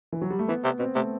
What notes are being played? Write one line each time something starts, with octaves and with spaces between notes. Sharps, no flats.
E3
F#3
G3
A3
E3 B3
C3
B2 C4
C3 A3